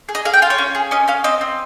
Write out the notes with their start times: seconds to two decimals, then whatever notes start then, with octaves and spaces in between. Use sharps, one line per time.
0.09 G#4
0.15 D#5
0.25 G#4 F5
0.33 G5
0.42 F4 F5
0.50 C#5
0.58 C#4
0.75 G#4
0.91 C#4 D#5
1.08 C#4 F5
1.24 C4 D#5
1.41 C4